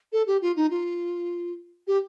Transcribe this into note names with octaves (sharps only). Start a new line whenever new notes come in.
A4
G4
F4
D#4
F4
G4